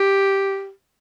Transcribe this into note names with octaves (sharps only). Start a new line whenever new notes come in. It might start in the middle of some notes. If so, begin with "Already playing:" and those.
Already playing: G4